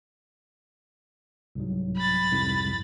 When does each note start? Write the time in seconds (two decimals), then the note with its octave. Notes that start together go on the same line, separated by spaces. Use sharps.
1.55 C2 G#2 F#3
1.97 B5 A6
2.31 C2 F2 G#2